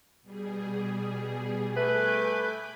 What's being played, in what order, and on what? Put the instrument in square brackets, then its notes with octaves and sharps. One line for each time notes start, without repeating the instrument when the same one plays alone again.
[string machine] B2 G3 G#4
[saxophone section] A3 B4 [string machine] G#5 D6 G6
[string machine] B5